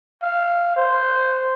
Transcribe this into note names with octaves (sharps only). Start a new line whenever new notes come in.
F5
C5